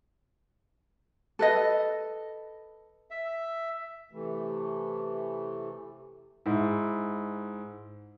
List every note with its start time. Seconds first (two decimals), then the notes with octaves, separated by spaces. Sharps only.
1.39 A4 B4 D#5
3.11 E5
4.12 C3 E3 A3
6.46 G#2 E4